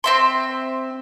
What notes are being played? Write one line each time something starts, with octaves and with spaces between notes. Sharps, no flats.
C4 E5 C6